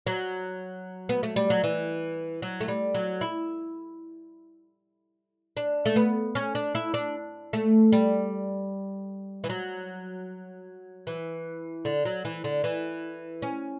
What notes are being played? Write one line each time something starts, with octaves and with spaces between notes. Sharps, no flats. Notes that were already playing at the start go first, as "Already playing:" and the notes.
F#3
B3
A3
G3
F#3
E3
F#3
A3
G3
F#3
E4
D4
A3
B3
C#4
D4
E4
D4
A3
G3
E3
F#3
E3
D3
F#3
E3
D3
E3
C#4